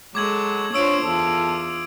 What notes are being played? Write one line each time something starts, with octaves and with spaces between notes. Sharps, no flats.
F#3 G#3 A4 D6 G#6 F#7
D4 F4 C5 C#5 D#6 E6 D7
E2 F4 A4